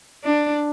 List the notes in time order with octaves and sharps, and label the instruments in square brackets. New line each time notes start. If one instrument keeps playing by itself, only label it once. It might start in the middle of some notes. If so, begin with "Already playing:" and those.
[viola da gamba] D4